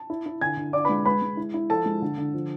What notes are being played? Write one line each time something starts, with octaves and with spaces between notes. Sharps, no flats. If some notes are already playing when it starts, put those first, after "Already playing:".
Already playing: A5
E4
E4
D3 G#5 G#6
D3
D4 D5 D6
G#3 B4 B5
G#3 B4 B5
G#3
E4
E4
F3 A4 A5
G#3
D3
D3
F3